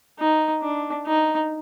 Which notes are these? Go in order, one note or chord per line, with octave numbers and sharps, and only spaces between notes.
D#4
D4
D#4